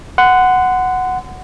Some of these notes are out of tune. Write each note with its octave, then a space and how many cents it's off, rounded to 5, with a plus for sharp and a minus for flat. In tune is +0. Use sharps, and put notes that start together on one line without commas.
F#5 +0 C6 -35